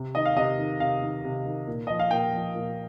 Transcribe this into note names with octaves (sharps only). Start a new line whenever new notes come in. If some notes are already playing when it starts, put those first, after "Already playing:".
Already playing: C3
D#3 D#5
F5
C3 D#5
D#3
C3 F5
D#3
C3
D#3
A#2
F3 D#5
F5
A#2 G5
F3
A#2